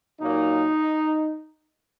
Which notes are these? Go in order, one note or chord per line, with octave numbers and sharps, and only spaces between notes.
A#2 F#3 A#3 D#4